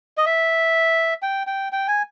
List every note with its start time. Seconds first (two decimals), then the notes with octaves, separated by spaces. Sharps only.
0.17 D#5
0.26 E5
1.22 G5
1.47 G5
1.72 G5
1.88 G#5